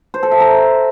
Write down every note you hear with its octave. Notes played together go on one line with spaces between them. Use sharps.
C5
A4
E5
A#5